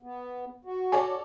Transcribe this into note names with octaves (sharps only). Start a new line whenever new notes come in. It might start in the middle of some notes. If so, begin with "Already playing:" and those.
B3
F#4
A4 C#5 D5 G#5